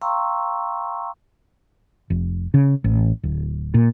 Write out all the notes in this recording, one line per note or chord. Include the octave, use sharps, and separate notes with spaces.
F5 G5 A#5 C6 C#6 E6
F1
C#3
A1
D1
A#2